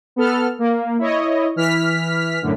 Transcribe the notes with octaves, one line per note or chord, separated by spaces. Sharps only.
B3 A4 F6
A#3
E4 C#5 D#5
E3 F6 B6
F#2 A2 D3